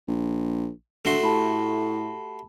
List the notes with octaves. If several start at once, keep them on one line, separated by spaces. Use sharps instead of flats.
A#1
D3 A3 F#4 C6
A2 G4 A5 B5